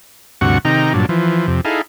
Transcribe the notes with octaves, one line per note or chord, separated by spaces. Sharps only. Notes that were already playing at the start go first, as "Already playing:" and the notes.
D2 G2 C3 F#4 F#5 C#6
C3 D#3 D#4 G5 A#5
G2 A#2 F#3 D4
E3 F3
F2 C3
D#4 E4 G#4 A4 F5